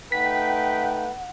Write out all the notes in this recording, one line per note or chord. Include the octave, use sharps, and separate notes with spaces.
A3 D#4 B4 F#5 G5 B6